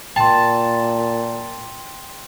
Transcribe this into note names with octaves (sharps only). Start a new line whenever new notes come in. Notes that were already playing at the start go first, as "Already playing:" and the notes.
A#2 G5 A5 C6